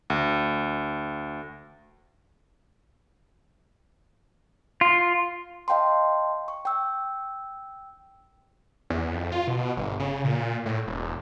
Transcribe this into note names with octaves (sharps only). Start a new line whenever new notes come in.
D2
F4
D#5 F5 G5 A5 C6
C#6
G5 E6
E2
F2
F4
B2
G1
C#3
A#2
A2
E1